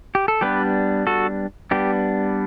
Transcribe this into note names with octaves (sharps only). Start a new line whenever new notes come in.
G4
A4
G3 B3 D4 G4 B4
F#4 A4
G3 B3 D4 G4